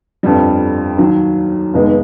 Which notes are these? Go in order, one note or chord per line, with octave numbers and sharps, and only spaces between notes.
G1 F2 D3 G3
D#2 D#3 F#3
F1 D#2 D#3 G#3 B3